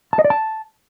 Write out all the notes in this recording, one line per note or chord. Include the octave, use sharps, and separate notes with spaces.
A5
D#5
D5
A5